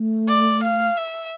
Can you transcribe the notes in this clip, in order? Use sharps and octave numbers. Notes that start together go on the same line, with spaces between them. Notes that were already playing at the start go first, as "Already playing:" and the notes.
Already playing: A3
D5
F5
E5